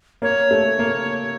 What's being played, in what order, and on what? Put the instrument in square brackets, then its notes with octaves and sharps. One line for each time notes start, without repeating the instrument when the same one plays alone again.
[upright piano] A#3 [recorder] C#5
[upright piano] A3
A#3